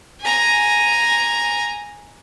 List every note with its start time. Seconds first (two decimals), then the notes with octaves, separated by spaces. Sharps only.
0.21 G#5 A#5